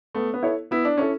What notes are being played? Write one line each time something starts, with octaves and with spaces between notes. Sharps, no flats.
A3 B3
B3
E4 A4 C#5
B3 E4
D4
C#4 E4 A4 C#5